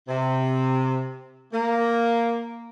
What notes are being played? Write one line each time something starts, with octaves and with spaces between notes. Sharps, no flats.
C3
A#3